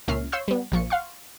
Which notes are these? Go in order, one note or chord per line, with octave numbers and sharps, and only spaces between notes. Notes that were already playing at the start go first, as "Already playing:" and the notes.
C#2 A#2 C#4 E5 F6 C7
C#5 F5 C6 C#6 E6 G6
G3 B3
A#1 A#2 F3 C#6 C#7
F5 F#5 C6 C#6